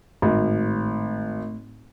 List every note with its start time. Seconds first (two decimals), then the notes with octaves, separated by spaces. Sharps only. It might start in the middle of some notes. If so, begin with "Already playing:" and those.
0.22 G#1 A2